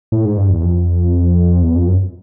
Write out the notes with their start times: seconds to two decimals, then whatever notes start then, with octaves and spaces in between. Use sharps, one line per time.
0.12 A2
0.25 G#2
0.37 G2
0.50 E2
0.63 F2
1.62 E2
1.76 F2
1.88 F#2